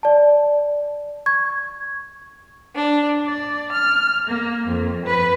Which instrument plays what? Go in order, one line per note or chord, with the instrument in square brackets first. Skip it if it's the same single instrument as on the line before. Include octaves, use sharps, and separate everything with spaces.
[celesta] D5 A5
C#6 G#6
[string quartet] D4
D5
F6
A#3
F2
B4